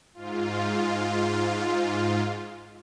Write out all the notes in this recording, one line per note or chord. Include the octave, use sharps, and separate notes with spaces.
G#2 F4